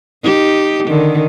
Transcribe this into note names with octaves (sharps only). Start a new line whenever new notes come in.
D#4 G4
D3 D#3